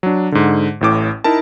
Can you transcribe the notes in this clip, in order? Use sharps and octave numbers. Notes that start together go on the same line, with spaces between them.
F#3 D4
G#2 D3
A1 A2 D6
D#4 E4 A#4 A5